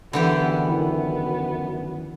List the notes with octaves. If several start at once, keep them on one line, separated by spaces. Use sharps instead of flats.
F#2 D3 E3 B3 G4
D#3 B3 E4